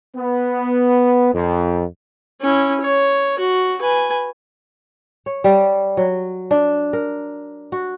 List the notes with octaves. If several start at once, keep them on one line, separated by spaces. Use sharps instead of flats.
B3
F2
C#4 E4
C#5
F#4
B4 G#5
C#5
G3
F#3
D4
A#4
F#4